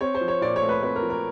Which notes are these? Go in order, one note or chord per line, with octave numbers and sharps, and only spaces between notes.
C4 C#5
C5
F3
C#5
A#2 D5
C#5
A3
B4
C4 B4
A#4
F3
A#4